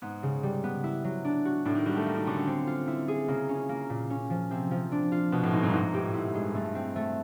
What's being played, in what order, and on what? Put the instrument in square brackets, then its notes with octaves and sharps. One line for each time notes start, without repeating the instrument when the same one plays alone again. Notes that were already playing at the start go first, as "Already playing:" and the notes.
[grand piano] G#2 [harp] B3
[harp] C#3
G3
B3
E4
F#3
D4
F#4
[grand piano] A2 [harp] D4
[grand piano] D#3
[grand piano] G3 [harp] F#4
[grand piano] A3
[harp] A#3
[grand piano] D#3
[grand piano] D3 [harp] C#4
[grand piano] D3
[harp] C4
F4
E4
G#4
[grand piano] C#3 [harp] A#3
[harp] C#4
A#3
A#2
C#4
F3
[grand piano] C3 [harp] C4
[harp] F3
D4
F4
[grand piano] B2 [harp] B3
[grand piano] A2
[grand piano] G#2 [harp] D#4
[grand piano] G2
[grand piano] G#2 [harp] D#4
[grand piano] A2 [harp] G4
[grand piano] G#2 [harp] E4
[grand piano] G#2
[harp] G#3
[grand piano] G2
[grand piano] G2 [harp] A3
[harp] C4
A3